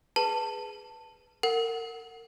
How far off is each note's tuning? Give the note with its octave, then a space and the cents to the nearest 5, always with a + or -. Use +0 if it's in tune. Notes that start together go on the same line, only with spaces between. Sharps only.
G#4 +0 B4 +0 A5 +15
A#4 -35 F#5 +0